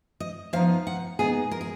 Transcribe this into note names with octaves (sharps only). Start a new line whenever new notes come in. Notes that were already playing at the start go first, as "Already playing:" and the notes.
D#5
F3 B3 D#4 F5
F#5
A#2 G#3 B3 D#4 G#4
A#4
G#4